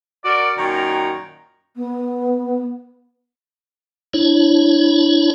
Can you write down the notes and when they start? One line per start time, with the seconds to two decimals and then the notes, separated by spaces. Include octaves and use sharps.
0.24 F#4 A#4 D5
0.57 F#2 A#2 D#3 C#5 G5 A#5
1.74 B3
4.14 D4 E4 C#5